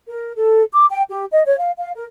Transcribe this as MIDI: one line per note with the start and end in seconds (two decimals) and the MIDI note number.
0.08 0.32 70
0.34 0.63 69
0.72 0.86 86
0.90 1.01 79
1.09 1.25 67
1.32 1.40 75
1.46 1.55 73
1.58 1.71 77
1.77 1.90 77
1.95 2.04 70